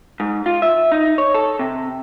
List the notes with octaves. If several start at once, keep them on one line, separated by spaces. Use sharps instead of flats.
G#2
F4
E5
D#4
C#5
A4
C3